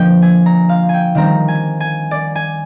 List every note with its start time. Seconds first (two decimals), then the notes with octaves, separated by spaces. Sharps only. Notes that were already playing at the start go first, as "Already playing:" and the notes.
Already playing: D3 F3 A#3 D#5 G5
0.22 G#5
0.46 A#5
0.69 F5
0.89 G5 G#5
1.15 D#3 G3 C4 A#5
1.48 G#5
1.80 G#5
2.11 D5
2.35 G#5